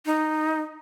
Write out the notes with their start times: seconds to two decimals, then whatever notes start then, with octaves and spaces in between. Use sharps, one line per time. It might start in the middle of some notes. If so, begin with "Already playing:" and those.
0.06 D#4